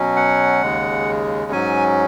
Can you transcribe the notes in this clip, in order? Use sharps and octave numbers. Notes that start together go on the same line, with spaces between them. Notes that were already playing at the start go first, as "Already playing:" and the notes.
Already playing: B2 F#3 C#4
F#5
D#2 C#3 G#3
G#2 F#3 C#4 G#5